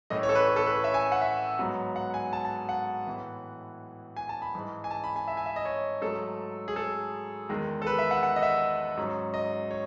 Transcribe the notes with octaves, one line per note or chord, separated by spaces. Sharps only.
A2 E3 A3 C#4 D#5
C#5
A4
B4
C#5
A4
B4
C#5
E5
G#5
F#5
E5
G#2 F#3 B3
F#5
G#5
A5
A5
F#5
A2 E3 B3
G#5
A5
B5
G#2 E3 G#3
G#5
A5
B5
G#5
E5
G#5
E5
D#5
C#5
G#2 F#3 A3 A4
G#4
A4
E2 D#3 G#3
A4
B4
E5
F#5
F#5
D#5
E5
G#2 F#3 C#4
D#5
C#5